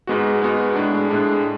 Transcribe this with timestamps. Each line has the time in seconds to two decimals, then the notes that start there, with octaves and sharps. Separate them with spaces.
0.07 G#2 G#3 B3 F#4
0.41 G#2 G#3 B3 F#4
0.75 A2 G#3 D4
1.10 A2 G#3 D4